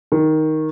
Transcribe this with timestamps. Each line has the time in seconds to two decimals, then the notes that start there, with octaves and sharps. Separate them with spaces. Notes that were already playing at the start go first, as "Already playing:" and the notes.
0.12 D#3